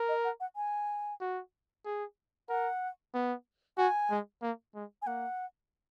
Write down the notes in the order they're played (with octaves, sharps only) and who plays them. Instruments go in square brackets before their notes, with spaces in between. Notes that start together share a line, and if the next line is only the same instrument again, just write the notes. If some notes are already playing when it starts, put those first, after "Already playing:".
Already playing: [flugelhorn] A#4
[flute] D#5
F#5
F#5
G#5
[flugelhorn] F#4
G#4
[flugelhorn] A#4 [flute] F#5
[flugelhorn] B3
[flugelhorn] F#4 [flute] G#5
[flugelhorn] G#3
A#3
G#3
[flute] G#5
[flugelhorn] A#3 [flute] F#5